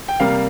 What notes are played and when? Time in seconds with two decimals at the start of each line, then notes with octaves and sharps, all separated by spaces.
0.08 G5
0.20 C3 G3 A#3 F5